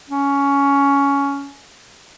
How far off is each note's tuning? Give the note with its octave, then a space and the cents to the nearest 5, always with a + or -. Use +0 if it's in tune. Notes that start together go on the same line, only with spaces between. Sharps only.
C#4 +15